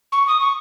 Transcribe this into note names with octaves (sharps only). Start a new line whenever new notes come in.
C#6
D#6
C#6